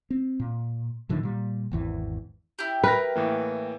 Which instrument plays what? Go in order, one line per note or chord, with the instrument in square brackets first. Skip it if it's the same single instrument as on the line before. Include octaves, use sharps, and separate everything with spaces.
[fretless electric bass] C4
A#2
A2 D3 D#3 F3
A#2 G3
G#1 E2 E3
[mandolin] E4 G4
[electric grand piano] A#4 F6 A#6 [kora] B4
[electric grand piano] A2 E3 A#3